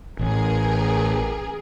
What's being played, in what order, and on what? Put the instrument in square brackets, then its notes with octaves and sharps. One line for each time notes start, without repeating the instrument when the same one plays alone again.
[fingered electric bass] A1 [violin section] G#4 A#4